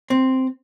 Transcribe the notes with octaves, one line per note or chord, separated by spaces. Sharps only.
C4